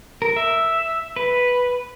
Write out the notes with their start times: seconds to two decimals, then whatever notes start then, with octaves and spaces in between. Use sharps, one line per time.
0.22 A#4
0.36 E5
1.16 B4